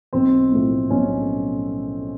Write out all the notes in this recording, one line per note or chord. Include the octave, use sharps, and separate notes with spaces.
B1 C4
A2 F3 A3
B1 C#4